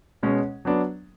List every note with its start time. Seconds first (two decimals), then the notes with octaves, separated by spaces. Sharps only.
0.23 B2 G#3 C#4
0.65 F#3 B3 D4